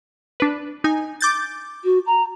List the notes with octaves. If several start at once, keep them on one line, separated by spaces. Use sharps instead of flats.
D4 B4
D#4 G#5
D6 G6 A6
F#4
A#5